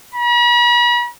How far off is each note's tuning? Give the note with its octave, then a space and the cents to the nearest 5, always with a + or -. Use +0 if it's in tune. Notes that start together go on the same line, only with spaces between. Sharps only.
B5 -45